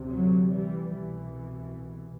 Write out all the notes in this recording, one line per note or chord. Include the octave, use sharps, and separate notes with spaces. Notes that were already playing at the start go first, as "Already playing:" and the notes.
Already playing: D2 C3
D3 F#3
E3 G3
C2 B2 E3